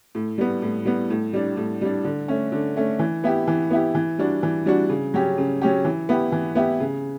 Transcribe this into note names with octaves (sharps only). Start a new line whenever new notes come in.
A2
G3 B3
A2
G3 B3
A2
G3 D4
A2
G3 D4
D3
A3 C#4
D3
A3 C#4
E3
B3 E4 G4
E3
B3 E4 G4
E3
G3 D4 F#4
E3
G3 D4 F#4
C#3
F#3 C#4 G4
C#3
F#3 C#4 G4
E3
B3 E4 G4
E3
B3 E4 G4
C#3